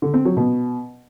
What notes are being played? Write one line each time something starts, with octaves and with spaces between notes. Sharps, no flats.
D3
C4
F#3
B2